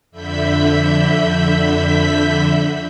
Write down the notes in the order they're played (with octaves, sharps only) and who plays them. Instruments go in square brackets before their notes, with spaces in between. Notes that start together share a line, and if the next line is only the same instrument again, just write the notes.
[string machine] F2 D3 E5 B5 G6 B6